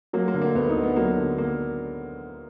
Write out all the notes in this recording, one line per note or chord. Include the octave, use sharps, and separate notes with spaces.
F#3 A#3
A#3
D3
A#3
D2 B3
D#4
D2
B3
F#3 A#3
D3
A#3